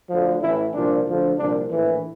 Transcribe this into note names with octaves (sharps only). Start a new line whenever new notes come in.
D2 D3 F3
A1 A2 E3 E4
C2 A#2 F3 D4
D2 D3 F3
C2 A#2 F3 D4
A#1 A2 E3